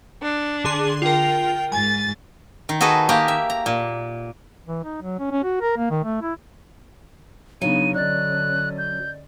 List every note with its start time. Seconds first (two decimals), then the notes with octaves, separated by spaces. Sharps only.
0.21 D4
0.64 D3 G#4 C6
1.02 F4 A#4 G5
1.72 G#2 G#5 A6
2.69 D#3
2.81 F#4 G#4 A4 B4 D#5
3.09 A#3 G4 D#5
3.28 E5
3.50 A#5
3.66 A#2
4.67 E3
4.84 D#4
5.02 F#3
5.19 C#4
5.31 C#4
5.44 F#4
5.61 A#4
5.77 A#3
5.91 D#3
6.04 A3
6.22 E4
7.61 C#3 F#3 B3 D4 D#4 F5 D#7
7.94 D3 C#4 D5 D#5 F#6 A6
8.78 G6